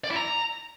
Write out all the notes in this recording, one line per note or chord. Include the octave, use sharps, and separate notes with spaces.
D5
E4
A#5